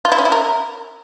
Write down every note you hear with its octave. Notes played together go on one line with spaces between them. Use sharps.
F4
E4
C#4
E4
A#4